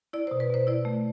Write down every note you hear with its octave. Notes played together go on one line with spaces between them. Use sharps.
E4 D5
B2 C5
B4
B2 C5
E4 D5
A3